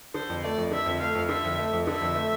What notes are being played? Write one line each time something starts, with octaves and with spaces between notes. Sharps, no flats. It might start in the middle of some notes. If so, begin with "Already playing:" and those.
D3 C5
F2
A3 D5
F2
D3 E5
F2
A3 F5
F2
D3 E5
F2
A3
F2
D3 E5
F2
A3